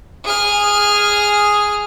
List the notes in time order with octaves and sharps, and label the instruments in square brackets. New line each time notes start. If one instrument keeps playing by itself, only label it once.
[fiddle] G#4 F6